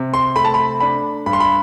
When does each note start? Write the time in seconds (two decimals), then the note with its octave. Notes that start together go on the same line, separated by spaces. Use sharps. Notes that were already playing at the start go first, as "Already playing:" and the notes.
Already playing: C3
0.14 C6
0.36 A3 B5
0.45 A5
0.54 B5
0.80 D4 B5
1.26 G2 B5
1.33 C6
1.40 B5